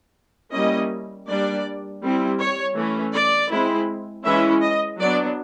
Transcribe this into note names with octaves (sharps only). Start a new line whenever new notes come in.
G3 A#3 C#4 E4 D#5
G3 A#3 D4 D5
G3 C4 E4
C#5
E3 A3 C#4
D5
G#3 C4 E4
E3 G#3 C#4 E4 E5
D#5
F#3 B3 D4 D5